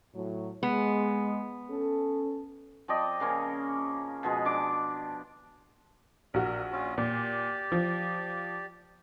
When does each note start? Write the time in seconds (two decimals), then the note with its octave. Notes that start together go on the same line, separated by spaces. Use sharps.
0.14 A2 F#3
0.63 G#3 B3
1.70 C#4 A4
2.88 F3 C4 D5 D#5
3.20 C#3 A#3 C#4
4.23 B2 F3 G#3
4.45 D4 D6
6.34 A#1 F#4 A#4
6.72 C#4 F4
6.98 A#2 G4 D5
7.72 F3